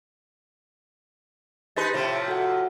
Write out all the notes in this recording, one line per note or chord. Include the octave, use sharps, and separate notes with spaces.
D#4 G4 G#4 B4 C6 A6
A2 C3 F3
F#4 A4 F#5